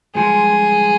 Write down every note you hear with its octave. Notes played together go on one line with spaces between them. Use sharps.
G2 F3 G#3 G#4